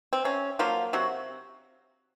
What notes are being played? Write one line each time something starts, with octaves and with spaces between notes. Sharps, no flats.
C4
C3 C#4
F3 F#3 A#3 F4
C3 F#3 F#4